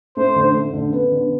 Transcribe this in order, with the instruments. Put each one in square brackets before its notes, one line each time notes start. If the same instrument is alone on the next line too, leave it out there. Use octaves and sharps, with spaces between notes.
[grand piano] A3 [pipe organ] C5
[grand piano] D3
A3
D3
B3
D3